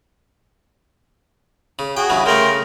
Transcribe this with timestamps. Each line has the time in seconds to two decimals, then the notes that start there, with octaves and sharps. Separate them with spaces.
1.79 C#3
1.97 F#4 G#4 G5
2.10 G2 C#3 E3
2.26 C#3 A3 A#4 G5 C6